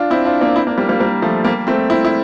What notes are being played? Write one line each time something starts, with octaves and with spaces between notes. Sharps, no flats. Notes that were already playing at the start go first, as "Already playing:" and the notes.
Already playing: D4 F4
C4 E4
D4 F4
A#3 D4
C4 E4
A#3 D4
G3 A#3
G3 A#3
G3 A#3
F3 A3
G3 A#3
A3 C4
C4 E4
E4